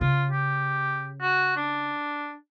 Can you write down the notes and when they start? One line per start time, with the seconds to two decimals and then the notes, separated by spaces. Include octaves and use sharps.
0.01 C#3 F4
0.31 G4
1.21 F#4
1.57 D4